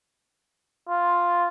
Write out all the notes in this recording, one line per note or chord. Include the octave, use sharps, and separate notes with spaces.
F4